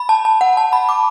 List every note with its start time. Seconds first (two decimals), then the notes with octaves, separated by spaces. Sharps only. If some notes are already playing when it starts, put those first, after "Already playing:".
Already playing: B5
0.09 A5
0.25 A5
0.41 F#5
0.57 A5
0.73 B5
0.89 D6